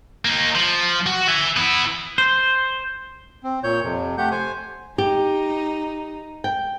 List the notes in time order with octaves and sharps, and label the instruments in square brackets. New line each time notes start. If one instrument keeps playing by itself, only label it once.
[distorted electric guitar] A#3 D#4
F3
F#4
E5 G#5
B3 E4
[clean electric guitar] C5
[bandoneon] C4
A#2 C#5 G6
F2 C3
A3 G4 F#5 G6
C5 G#5
[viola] D#4 [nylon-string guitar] G4
[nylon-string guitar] G5